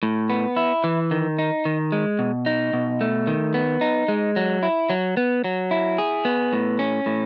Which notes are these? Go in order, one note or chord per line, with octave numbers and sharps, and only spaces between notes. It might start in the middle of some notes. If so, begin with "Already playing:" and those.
A2
B3
E4
E3
D#3
D#4
D#3
G#3
B2
D#4
B2
A3
D#3
B3
D#4
G#3
F#3
E4
F#3
B3
F#3
E4
G#4
B3
A2
C#4
A2